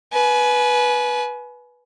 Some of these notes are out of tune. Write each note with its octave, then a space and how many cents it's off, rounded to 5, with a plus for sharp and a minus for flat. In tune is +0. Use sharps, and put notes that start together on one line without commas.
B4 -10 G#5 +30